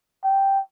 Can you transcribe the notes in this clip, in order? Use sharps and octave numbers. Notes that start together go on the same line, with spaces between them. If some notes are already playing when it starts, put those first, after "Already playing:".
G5